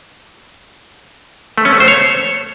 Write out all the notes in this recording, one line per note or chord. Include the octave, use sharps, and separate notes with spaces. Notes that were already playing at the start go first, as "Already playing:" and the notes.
A3
C#4
A3
C5
C#5